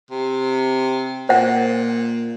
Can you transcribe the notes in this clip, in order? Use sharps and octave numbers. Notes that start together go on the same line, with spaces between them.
C3
A#2 C5 F#5